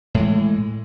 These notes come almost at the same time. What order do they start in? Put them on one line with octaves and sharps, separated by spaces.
A2 G#3 E3